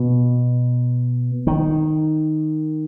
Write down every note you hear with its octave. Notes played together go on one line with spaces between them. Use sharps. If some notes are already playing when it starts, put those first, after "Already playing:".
Already playing: B2
D#3